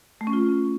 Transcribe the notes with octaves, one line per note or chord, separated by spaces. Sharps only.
A3
C#4
F4